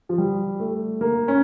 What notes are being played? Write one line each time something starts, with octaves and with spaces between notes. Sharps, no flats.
F3
G3
A3
A#3
C#4